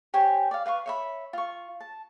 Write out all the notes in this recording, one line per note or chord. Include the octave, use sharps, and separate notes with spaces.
G4 C5 C#5 G#5
D5 F5
B4 F5 A#5 C#6
C#5 E5 B5
F4 C#6
A5